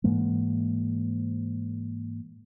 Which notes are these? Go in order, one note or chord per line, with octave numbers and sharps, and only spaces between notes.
G#2 E3 G#3 A#3